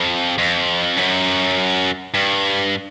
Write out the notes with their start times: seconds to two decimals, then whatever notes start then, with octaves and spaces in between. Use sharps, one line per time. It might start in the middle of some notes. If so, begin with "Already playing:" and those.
Already playing: F2
0.38 F2
0.96 F#2
2.14 G2